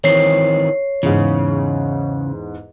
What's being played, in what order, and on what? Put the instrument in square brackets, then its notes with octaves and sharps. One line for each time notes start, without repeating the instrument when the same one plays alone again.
[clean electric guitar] D#3 E3 C4 [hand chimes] C#5 C7
[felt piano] E2 G#2 [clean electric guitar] C#3